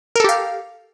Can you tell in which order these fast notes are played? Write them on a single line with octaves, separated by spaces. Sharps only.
A#4 A4 G4 F5